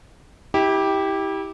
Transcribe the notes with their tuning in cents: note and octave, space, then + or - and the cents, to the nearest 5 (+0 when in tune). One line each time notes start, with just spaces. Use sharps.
E4 -30 G4 +0